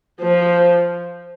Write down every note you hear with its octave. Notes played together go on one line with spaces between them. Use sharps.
F3